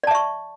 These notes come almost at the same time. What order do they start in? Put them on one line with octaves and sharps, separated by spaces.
D5 A5 E5 C#6